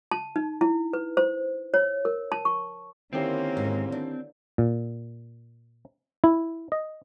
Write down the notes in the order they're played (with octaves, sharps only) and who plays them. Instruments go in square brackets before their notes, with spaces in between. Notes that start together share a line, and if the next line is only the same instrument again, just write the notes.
[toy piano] A5
D#4
E4
B4
C5
C#5
A#4
A5
C#6
[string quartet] D3 A#3 C#4 [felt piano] D#3 E4 G4 [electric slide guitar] C4
[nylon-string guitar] G#2
D4
[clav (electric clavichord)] A#2
E4
D#5